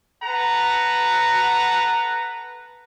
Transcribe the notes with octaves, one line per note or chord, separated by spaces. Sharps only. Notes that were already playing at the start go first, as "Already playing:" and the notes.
A4 B4 F#5 A#5